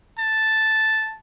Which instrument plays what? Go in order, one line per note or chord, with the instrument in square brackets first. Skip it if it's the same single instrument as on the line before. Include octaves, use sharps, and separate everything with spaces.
[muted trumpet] A5